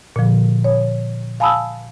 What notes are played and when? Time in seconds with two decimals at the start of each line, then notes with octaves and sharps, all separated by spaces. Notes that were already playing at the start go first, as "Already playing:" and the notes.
0.16 A#2 D3 F3
0.64 C#5
1.40 F5 G#5 A5 B5 D#6 E6